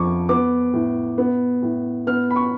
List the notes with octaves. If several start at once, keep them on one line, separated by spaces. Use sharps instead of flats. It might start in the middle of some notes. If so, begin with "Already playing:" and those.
Already playing: F2 F3 C#6 D6
B3 D6
A2
B3
A2
B3 F6
B5
C#6